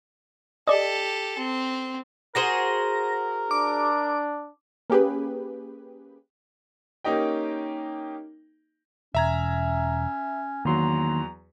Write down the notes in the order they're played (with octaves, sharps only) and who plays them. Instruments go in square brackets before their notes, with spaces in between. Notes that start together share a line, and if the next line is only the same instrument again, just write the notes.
[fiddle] G4 A4 [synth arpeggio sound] D5 D#5
[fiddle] C4
[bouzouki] F#4 G#4 C5 [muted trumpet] A#4 [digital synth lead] A#6
[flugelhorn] D4 [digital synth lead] D6
[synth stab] A#3 C#4 G4 G#4 B4
[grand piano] A#3 C#4 D#4 G4 D#5 G5
[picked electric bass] E1 [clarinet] C#4 [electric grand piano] E5 A#5 G#6
[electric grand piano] E2 F#3 [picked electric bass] D#3 [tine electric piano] A#3 C6 [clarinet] A#5